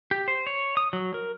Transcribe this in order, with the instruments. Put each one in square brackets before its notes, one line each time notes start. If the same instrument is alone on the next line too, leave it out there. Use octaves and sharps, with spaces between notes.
[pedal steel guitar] G4
C5
C#5
D#6
F#3
A#4